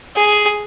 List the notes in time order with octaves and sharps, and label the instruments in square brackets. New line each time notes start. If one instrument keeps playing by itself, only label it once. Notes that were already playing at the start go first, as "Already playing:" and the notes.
[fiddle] G#4